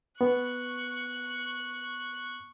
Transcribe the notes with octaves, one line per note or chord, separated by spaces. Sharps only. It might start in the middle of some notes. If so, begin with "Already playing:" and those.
B3 C#6 F#6